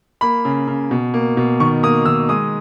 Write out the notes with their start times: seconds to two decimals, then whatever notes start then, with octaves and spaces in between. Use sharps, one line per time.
0.21 A#3 B5
0.45 C#3
0.68 C#3
0.91 B2
1.14 A#3
1.37 B2
1.60 D#3 C#6
1.83 A#3 D#6
2.06 D#3 E6
2.29 G#3 D#6